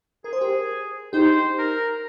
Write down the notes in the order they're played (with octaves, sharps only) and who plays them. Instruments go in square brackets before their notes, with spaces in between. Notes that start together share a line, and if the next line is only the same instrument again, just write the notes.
[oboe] G#4 [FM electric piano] A#4
[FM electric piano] C5
G4 A#4
[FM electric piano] D#4 G4 [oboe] C5
[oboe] A#4